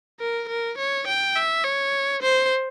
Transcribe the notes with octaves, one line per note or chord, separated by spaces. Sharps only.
A#4
A#4
C#5
G5
E5
C#5
C5